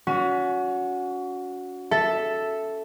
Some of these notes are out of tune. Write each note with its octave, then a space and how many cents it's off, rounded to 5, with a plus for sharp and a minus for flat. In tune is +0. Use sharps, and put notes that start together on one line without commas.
C#4 +30 F#4 -15
A4 +0 E5 +0